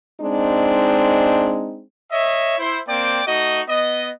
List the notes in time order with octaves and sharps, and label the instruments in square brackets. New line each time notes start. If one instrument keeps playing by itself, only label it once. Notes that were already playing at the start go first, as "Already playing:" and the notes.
[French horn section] G#3 C4 D4 D#4
[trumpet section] C#5 D#5 E5
E4 C5
A#3 C4 D5 G5 D6
A3 D#4 F#4 D#5
B3 D#5